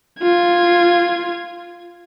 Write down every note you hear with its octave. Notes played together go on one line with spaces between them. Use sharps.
F4 G#6